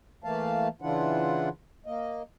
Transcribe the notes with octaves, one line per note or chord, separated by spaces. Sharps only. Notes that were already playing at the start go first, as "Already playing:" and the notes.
E3 A3 A#3 F5 A5
C#3 E3 D4 E4 F4 F#5
A#3 D#5